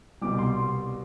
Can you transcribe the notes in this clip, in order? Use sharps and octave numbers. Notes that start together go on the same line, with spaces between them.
C2 B2 G3 D6
C6